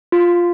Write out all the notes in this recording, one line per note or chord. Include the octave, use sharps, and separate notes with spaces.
F4